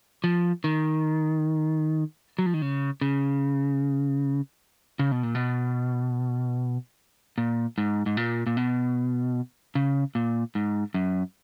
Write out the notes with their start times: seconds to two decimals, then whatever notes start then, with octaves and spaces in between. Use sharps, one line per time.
0.24 F3
0.64 D#3
2.39 F#3
2.46 F3
2.54 D#3
2.62 C#3
3.01 C#3
4.99 C#3
5.12 B2
5.23 A#2
5.35 B2
7.38 A#2
7.78 G#2
8.06 G#2
8.17 A#2
8.47 A#2
8.57 B2
9.75 C#3
10.15 A#2
10.55 G#2
10.94 F#2